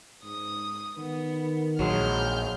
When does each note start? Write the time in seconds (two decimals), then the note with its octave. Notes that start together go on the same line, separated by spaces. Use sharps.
0.24 G#2 D#6
0.98 D#3 B3
1.79 A#1 F#3 G#3 G#4 F6 G6